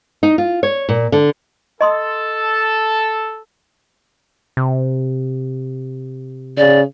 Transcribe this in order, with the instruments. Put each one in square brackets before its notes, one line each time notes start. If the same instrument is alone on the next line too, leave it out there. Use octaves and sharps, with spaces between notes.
[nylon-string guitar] D#4
F4
C#5
A#2
D3
[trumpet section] A4 A5 [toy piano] D#5 C6 D#6
[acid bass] C3
[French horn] C#3 [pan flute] D5